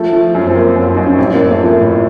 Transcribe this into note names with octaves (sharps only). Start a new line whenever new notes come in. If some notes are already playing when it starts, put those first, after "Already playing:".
Already playing: F3 A3
F3
F#2
C4
F3 A#3
F#2
F4
F#2 D#4
C#4
A1 C4
A#3
A1
A3
F3
A#3
A2